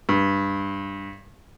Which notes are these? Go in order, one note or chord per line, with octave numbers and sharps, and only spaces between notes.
G2